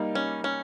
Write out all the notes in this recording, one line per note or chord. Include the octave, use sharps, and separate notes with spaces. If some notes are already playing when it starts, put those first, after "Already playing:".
Already playing: G3 A#3 D#4
C#4
C#4